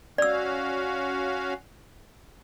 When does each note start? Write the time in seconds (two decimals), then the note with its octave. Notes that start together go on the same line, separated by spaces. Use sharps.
0.18 C#4 F#4 D5 F5 E6